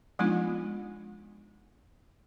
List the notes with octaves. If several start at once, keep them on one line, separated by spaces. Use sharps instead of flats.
F3 G#3 B3 D4 D#4 F4